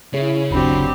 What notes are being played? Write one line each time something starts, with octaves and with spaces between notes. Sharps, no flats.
C#3 C#4 E4 G#4 C#5
G1 D#2 F#3 C4 D4 G4 B5